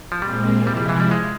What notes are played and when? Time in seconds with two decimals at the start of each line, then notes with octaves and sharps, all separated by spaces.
0.12 F3
0.22 A#2 G3 G#3 C4
0.66 C3 F3 G3 G#3 E4
0.77 G3
0.89 E3
1.00 G3
1.11 G#3